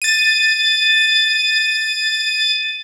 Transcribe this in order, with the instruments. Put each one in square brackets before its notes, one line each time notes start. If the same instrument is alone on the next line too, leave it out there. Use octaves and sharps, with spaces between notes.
[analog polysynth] A6 D#7